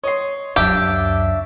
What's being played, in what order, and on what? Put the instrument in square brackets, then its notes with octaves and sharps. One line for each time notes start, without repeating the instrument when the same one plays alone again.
[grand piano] C#5 [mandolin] D#5 C6
[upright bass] C#2 F#2 [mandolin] D4 E5 F5 [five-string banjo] G4